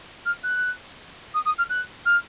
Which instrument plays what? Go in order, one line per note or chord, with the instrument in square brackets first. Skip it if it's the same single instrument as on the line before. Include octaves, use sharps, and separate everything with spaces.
[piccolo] F6
F#6
D#6
D#6
F6
F#6
F6